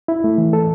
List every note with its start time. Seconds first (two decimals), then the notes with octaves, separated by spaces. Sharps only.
0.08 E4
0.24 A3
0.38 E3
0.53 A4